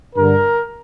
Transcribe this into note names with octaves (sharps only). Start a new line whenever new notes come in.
G2 D3 A#4